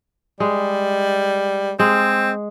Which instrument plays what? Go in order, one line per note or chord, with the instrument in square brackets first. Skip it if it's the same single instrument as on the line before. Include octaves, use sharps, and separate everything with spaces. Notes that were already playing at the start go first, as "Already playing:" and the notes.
[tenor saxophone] G3 [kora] G#3
[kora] G#3 [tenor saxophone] C4